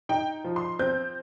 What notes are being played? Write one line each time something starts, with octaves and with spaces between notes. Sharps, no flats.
D#4 G5
F3
C6
C4 G6